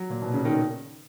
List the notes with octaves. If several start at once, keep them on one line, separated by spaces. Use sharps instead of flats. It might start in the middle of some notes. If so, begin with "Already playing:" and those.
Already playing: F#3
A#2
B2
C#3
D#3